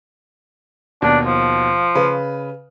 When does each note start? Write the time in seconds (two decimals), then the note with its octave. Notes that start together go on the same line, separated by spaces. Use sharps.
1.02 D#2 B2 D4
1.26 F3
1.95 C#3 B4